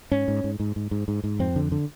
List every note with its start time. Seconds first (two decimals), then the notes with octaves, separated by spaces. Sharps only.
0.11 G#2 C#4
0.28 G#2
0.44 G#2
0.60 G#2
0.76 G#2
0.91 G#2
1.08 G#2
1.24 G#2
1.39 F2 C4
1.56 D3
1.72 D3